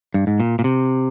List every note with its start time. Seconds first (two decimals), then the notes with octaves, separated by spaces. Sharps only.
0.14 G2
0.27 G#2
0.40 A#2
0.59 A#2
0.64 C3